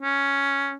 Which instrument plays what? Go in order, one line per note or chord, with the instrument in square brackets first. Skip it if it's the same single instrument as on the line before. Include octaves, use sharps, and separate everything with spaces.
[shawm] C#4